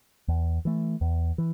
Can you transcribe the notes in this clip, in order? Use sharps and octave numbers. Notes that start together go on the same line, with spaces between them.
E2
E3 A3
E2
E3